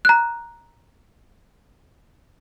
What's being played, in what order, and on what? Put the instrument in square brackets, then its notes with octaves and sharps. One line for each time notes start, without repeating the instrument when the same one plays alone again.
[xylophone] A#5 F#6